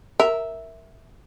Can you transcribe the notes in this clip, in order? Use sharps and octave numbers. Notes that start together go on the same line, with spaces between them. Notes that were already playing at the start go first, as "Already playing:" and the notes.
A#4 E5